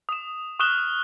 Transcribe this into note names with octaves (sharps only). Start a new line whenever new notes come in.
D#6 E7
C#6 D#6 F6 F#6 E7 G7